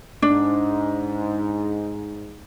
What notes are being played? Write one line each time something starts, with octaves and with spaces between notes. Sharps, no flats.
G#2 D4